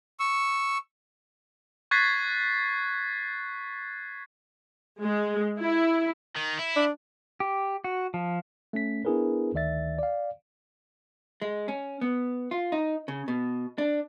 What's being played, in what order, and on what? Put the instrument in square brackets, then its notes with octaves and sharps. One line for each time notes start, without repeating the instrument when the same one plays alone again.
[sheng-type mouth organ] C#6 E6
[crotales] C#6 F#6 G#6 A6 B6 C7
[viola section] G#3
E4
[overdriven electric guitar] D#3
E4
[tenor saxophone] D4
[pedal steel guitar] G4
F#4
F3
[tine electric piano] A3 C#4 B6
B3 D4 E4 G#4 A#4 B4
D2 D#3 D5 E5 A6
D5 F5
[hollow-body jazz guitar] G#3
C#4
B3
F4
D#4
C#3
B2
D4